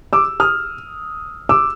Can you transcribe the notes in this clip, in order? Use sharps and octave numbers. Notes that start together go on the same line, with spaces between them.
D6 E6
D#6 F6
D6 E6